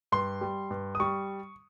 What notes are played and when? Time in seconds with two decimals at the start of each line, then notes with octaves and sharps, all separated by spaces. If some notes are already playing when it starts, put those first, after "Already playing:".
0.12 G2 C6
0.41 G3
0.70 G2
0.95 D#6
1.00 G3 C#6